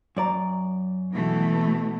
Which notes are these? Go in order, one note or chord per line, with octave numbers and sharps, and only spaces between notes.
F#2 D5 A#5
B2 E3 A3